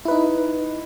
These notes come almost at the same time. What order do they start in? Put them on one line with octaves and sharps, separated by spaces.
E4 B4 D#4